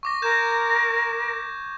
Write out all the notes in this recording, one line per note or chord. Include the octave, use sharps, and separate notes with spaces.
C#6 D6 A#6
A#4 G6 G#6 E7